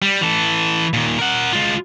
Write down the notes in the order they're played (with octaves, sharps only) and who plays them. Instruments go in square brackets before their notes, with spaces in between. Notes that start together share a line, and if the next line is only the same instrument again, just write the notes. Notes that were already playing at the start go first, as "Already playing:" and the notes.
[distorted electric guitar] G3
E3 A4
A#2 D#3
A#4 F#5
G#3 F4